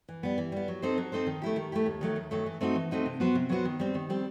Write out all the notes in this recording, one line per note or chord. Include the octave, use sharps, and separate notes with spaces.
E3
G3 B3
E3
G3 B3
F#3
C4 D#4 A4 C5
F#3
C4 D#4 A4 C5
D#3
A3 E4 G4
D#3
A3 E4 G4
D#2
D#3 F#3 A3
D#2
D#3 F#3 A3
E3
A3 C4 D#4 F#4
E3
A3 C4 D#4 F#4
C3
F#3 B3 F#4 C5
C3
F#3 B3 F#4 C5
D#3
G3 C4
D#3
G3 C4